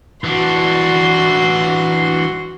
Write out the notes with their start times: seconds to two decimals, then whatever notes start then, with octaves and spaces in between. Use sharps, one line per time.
0.24 E3 D4 F#4 C6